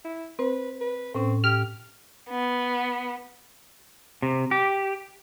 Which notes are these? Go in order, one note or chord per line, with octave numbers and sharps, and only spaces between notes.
E4
C4 B4 C5
B4
A2 C4 C#4
G4 F6
B3
C3
G4